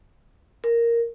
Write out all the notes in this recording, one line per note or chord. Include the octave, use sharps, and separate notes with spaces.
A#4